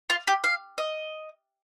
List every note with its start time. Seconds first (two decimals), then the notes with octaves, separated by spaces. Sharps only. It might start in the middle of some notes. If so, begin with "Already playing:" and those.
0.10 F4
0.27 G4
0.44 F5
0.78 D#5